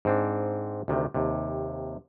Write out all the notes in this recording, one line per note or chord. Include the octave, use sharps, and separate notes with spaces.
G#2 C4 D4
D2 C3 D#3
D#2 C3